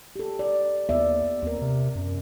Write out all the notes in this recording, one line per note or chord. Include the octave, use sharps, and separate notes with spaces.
G4 A4
D5
D#2 B3 D5 E5
D#2 C4 A#4
C3
F#2